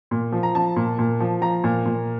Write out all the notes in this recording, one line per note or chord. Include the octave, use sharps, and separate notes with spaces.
A#2
F3
A#5
F3 A5
A#2
A#2
F3
F3 A#5
A#2
A#2